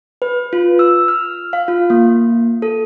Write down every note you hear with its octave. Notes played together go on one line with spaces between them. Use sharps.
B4
F4
E6
F6
F5
F4
A#3
A4